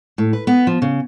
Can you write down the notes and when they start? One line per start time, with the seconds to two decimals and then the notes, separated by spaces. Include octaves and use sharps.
0.18 A2
0.33 B4
0.47 B3
0.67 F3
0.82 C#3